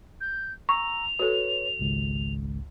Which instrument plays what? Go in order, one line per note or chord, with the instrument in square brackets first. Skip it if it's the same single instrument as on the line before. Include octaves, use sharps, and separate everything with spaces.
[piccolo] G6
[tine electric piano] A#5 E6 [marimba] C#6 [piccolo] F7
[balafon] F#4 A4 [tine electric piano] B4 C#5
[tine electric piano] G#1 C#2 G#2